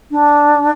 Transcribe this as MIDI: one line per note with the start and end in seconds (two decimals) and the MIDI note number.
0.11 0.70 62